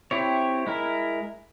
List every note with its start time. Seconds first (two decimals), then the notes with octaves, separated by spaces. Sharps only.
0.11 C4 E4 G4 C#5
0.67 G#3 E4 A#4